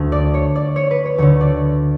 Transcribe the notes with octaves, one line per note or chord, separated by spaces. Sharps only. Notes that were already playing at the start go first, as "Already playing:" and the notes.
Already playing: D2
D5
C#5
D5
C#5
B4
C#5
D2 D3 C#5
D5